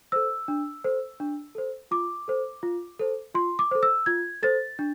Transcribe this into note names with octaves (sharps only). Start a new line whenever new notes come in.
A4 C5 E6
D4
A4 C5
D4
A4 C5
F4 D6
A4 C5
F4
A4 C5
F4 C6
D6
A4 C5
E6
F4 G#6
A4 C5 A6
D4